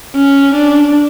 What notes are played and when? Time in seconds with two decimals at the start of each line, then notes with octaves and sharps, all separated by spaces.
0.16 C#4
0.55 D4